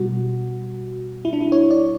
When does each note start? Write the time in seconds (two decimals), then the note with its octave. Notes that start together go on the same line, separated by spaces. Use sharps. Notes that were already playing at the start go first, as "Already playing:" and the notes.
Already playing: B2 G3 F#4
1.25 E4
1.33 D4
1.41 E4
1.52 C#5
1.71 D5